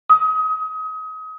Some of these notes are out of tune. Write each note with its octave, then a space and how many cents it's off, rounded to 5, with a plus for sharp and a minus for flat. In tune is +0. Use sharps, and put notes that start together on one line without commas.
D#6 +30